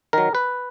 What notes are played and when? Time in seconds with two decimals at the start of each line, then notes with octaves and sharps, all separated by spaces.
0.13 D#3 F#3 A#4
0.35 B4